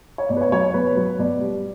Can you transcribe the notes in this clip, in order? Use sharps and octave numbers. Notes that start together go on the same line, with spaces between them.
C#5
B2 D5
B4
C#5
F#3 C#5
C#5
B2 B4
F#3
B2 D5
G3